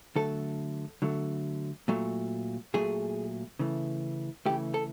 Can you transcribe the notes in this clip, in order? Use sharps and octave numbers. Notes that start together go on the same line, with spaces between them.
D3 F#3 A3 A4
D3 F#3 A3
A#2 F#3 A3
A#2 F#3 A3 G#4
C#3 E3 A3
C#3 E3 A3 G4
A4